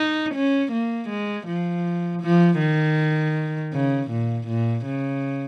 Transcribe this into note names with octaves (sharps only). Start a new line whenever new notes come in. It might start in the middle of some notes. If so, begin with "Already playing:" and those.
Already playing: D#4
C#4
A#3
G#3
F3
F3
D#3
C#3
A#2
A#2
C#3